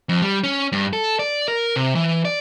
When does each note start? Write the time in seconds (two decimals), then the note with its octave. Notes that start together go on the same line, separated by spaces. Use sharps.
0.09 F2
0.22 G3
0.44 C#4
0.72 G2
0.93 A4
1.19 D5
1.48 A#4
1.76 C3
1.95 E3
2.25 D5